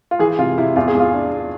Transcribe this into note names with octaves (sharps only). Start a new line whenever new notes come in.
F4
E3 G#4
C3 F4
C3 E4
E2 F4
G#4
E2 F4
D4